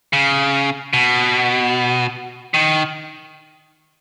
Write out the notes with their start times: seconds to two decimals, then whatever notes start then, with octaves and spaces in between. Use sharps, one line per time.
0.13 C#3
0.93 B2
2.54 D#3